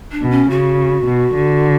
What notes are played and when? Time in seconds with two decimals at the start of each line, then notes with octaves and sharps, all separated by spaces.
0.12 D4
0.22 B2
0.31 C#4
0.50 C#3 F#4
1.06 B2
1.35 D3